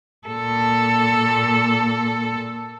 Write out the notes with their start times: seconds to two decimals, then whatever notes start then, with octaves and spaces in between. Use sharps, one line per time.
0.28 A#2 A4